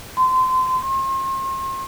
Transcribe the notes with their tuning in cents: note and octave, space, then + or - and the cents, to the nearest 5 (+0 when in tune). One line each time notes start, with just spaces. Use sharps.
C6 -25
C6 +40